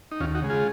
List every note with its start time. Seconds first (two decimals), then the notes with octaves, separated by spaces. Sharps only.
0.12 D#4
0.20 D#2 C#4 F4
0.35 D#4 F#4
0.42 C#3 G#3
0.50 F4 G#4